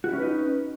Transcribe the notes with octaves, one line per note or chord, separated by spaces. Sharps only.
C#4 D#4 E4 F#4 B4